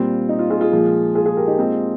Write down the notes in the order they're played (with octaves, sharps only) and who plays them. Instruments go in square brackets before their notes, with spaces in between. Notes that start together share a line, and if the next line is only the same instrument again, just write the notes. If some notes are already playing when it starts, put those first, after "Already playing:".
Already playing: [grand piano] A#2 G3 C4 F4
D#4
F4
F4 G#4
F4 G#4
A#2 F3 G#3
F4 G#4
F4 G#4
G4 A#4
D#4 G4
A#2 G#3 C4 D#4 F4